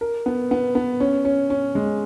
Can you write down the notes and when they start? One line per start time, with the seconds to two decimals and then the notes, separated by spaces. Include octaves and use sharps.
0.01 A#4
0.26 B3
0.51 B3
0.75 B3
1.00 C#4
1.25 C#4
1.50 C#4
1.75 G#3